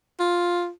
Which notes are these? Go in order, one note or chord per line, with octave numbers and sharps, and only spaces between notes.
F4